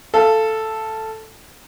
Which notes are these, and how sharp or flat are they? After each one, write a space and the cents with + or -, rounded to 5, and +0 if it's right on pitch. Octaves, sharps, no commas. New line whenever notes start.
A4 +0 F5 -20